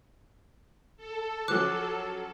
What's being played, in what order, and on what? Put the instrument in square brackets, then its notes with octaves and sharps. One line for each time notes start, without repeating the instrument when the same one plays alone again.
[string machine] A4
[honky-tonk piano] F3 F#3 C#4 [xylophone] D6 F#6